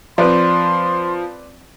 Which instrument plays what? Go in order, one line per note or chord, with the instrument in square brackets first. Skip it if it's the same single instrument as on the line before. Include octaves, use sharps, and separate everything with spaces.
[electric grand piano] F3 [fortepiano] C4 B4 D5 [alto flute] C6